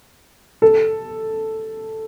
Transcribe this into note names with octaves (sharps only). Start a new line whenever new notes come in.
A4